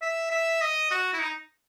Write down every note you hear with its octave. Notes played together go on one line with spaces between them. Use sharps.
E5
E5
D#5
F#4
E4
D#4